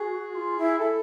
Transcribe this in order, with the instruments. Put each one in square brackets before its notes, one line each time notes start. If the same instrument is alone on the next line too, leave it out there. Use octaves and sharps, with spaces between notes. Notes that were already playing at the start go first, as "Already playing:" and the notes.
Already playing: [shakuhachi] F#4 [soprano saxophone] G#4
[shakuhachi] F4
E4
[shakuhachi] E4 [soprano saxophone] A4